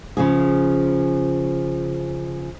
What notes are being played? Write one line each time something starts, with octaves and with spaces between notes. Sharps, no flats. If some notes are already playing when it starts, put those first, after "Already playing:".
C#3 F3 G#4